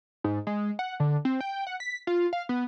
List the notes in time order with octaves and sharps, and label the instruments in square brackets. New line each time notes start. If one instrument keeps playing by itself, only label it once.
[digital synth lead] G#2
G#3
F#5
D3
C4
G5
F#5
B6
F4
F5
B3